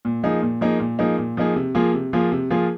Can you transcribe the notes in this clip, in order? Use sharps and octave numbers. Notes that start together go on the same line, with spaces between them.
A#2
F3 A#3 D#4 G#4
A#2
F3 A#3 D#4 G#4
A#2
F3 A#3 D#4 G#4
A#2
F3 A#3 D#4 G#4
C3
F3 A#3 F4 G#4
C3
F3 A#3 F4 G#4
C3
F3 A#3 F4 G#4